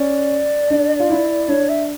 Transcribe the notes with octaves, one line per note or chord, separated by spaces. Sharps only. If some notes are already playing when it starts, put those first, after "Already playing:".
Already playing: C#4 D5
D4
F4
E4
D4 C#5
E5